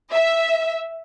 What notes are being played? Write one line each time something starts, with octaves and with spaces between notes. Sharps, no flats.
E5